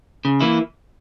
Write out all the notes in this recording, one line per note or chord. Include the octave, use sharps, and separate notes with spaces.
C#3
E3 A#3 E4